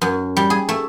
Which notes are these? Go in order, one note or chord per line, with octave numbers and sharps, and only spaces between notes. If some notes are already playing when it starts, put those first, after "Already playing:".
F#2
G3
G#4
A3